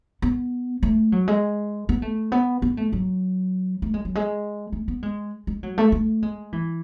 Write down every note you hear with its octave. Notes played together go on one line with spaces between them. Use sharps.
B3
A3
F#3
G#3
B3
A3
B3
B3
A3
F#3
A3
G#3
F#3
G#3
A3
B3
G#3
G#3
F#3
A3
A3
G#3
E3